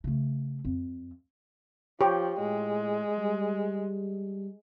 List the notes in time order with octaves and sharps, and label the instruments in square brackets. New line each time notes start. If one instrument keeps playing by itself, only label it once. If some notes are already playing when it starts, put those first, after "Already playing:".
[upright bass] C#3 A3
F2
[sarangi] F3 [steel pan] G4 C#5
[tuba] A2 [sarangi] G#3
[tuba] G3